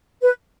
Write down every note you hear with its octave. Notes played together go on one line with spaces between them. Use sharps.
B4